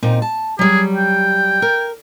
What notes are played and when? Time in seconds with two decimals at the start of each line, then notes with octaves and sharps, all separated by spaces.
0.03 A#2 C4 D#4
0.22 A5
0.59 F#3 G3 G#4
0.95 G5
1.62 A#4